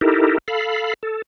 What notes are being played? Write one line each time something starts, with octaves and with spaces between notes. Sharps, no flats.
D#4 E4 G4 A4 A#4
A4 F5 B5
A4